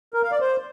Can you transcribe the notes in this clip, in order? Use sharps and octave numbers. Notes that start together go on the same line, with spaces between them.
A#4
F5
D5
C5